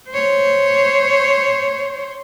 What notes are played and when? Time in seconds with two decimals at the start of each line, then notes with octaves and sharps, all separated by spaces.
0.10 C5 C#5